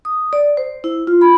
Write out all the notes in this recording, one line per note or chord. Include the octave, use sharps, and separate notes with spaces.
D#6
D5
C5
E4
F4
B5